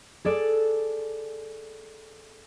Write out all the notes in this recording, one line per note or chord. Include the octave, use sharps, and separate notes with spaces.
G#4 A4 D5